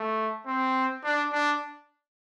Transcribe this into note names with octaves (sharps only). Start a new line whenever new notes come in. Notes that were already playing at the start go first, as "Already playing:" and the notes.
Already playing: A3
C4
D4
D4